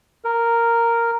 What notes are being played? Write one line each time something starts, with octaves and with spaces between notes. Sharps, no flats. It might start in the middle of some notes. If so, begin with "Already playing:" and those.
A#4